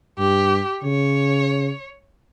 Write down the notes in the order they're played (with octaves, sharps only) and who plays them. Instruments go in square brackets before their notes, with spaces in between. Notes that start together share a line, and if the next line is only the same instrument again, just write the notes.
[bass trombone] G2 [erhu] G4
[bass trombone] C#3 [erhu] C#5